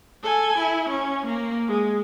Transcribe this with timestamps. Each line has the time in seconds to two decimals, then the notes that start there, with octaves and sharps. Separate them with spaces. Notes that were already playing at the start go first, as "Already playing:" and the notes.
0.23 A4 G#5
0.58 E4
0.89 C#4
1.26 A#3
1.68 G#3